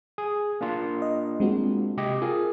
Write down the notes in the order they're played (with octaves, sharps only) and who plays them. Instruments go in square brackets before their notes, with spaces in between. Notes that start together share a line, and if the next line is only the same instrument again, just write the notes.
[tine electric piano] G#4
A#3 D4 F4
[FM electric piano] D#5
G#3 C4 F#4
[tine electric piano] C3 G4 D#5
[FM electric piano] F4 [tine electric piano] G#4 A#4